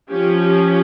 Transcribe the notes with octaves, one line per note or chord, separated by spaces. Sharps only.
F3 C#4 G4
G4